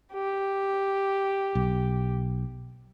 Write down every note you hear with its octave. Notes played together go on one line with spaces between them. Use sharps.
G4
B1